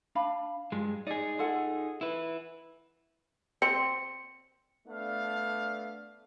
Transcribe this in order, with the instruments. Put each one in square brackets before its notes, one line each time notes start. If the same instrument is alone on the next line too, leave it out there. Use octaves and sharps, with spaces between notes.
[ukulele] D4 F5 B5
[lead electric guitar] G2 G#3 [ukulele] F4
[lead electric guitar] D#4 G#4 [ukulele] D5
[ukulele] F4 A4 F#5
[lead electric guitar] E4 B4
[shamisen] C4 [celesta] C#7
[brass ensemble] A3 B3 D4 F5